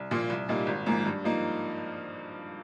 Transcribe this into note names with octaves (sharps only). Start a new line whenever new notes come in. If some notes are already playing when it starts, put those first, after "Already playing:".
Already playing: C2
A#2 F3 A#3 F4
C2
A#2 G3 A#3 D#4
G#1
G#2 F3 A#3
G2
F3 A#3 D#4